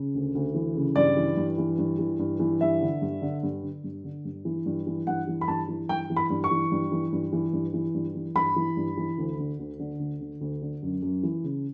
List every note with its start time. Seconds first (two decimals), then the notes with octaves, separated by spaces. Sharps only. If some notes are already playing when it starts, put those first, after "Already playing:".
Already playing: C#3
0.15 D2
0.35 D2
0.54 E3
0.76 C#3
0.96 G2 D5
1.17 E3
1.37 G2
1.58 E3
1.78 G2
1.99 E3
2.19 G2
2.40 E3
2.61 G2 E5
2.81 D3
3.02 G2
3.22 D3
3.43 G2
3.63 D3
3.84 G2
4.04 D3
4.25 G2
4.45 E3
4.66 G2
4.87 E3
5.07 G2 F#5
5.27 E3
5.41 B5
5.48 G2 A5
5.68 E3
5.89 G2 G5
6.10 E3
6.16 B5
6.30 G2
6.44 C#6
6.51 E3
6.72 G2
6.92 E3
7.12 G2
7.33 E3
7.53 G2
7.74 E3
7.94 G2
8.15 E3
8.35 G2 B5
8.56 E3
8.77 G2
8.97 E3
9.18 D2
9.39 D3
9.59 D2
9.79 D3
10.00 D2
10.21 D3
10.41 D2
10.62 D3
10.82 F#2
11.02 F#2
11.23 E3
11.44 C#3